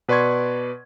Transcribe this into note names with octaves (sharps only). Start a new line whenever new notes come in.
B2 B4 D5 C6 C#6 G#6